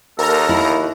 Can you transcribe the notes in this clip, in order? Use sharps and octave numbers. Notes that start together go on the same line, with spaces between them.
D#2 A4 A#4 A#5
E4